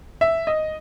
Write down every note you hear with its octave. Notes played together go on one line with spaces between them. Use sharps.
E5
D#5